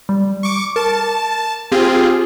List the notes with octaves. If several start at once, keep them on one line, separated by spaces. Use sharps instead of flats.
G3
C#6 D6 C#7
A#4 A5
C4 F4 G4 G#4